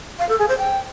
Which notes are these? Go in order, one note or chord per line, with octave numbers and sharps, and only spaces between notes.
F5
A4
G#4
C5
G5